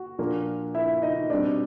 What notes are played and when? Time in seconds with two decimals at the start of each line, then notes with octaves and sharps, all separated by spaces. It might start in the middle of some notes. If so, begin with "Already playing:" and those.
Already playing: F#4
0.18 A#2 F3 A#3 D4
0.74 E4 E5
1.02 D#4 D#5
1.30 B2 G3 C4 D4 D#4 D5